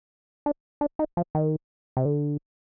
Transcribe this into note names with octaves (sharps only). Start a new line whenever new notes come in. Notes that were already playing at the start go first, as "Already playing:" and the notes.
D4
D4
D#4
F3
D#3
C3
D3